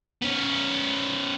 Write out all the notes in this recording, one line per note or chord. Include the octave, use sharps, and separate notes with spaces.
B3 C#4